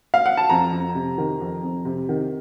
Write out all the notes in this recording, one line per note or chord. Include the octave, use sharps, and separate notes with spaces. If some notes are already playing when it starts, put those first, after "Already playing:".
F5
F#5
A5
F2 A#5
F2
C3
D#3
F2
F2
C3
D#3